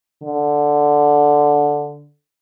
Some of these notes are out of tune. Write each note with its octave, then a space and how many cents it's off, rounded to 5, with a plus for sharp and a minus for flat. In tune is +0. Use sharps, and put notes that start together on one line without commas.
D3 +0